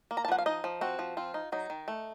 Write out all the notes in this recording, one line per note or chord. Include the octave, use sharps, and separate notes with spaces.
A#3
A#5
A5
F3 F#5
F5
D#4 D#5
F3
C4 F#4
F3
C4 F4
D#4
F#3 D#4
D#3
A3